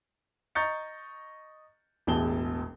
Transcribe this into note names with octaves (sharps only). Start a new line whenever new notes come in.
D#5 A#5 C#6 G6 A6 C#7
E1 A1 E2 G#4 A5 G7